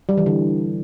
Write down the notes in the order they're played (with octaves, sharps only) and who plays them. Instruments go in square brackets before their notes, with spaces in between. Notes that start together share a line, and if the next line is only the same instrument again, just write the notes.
[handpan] G3
E3
D3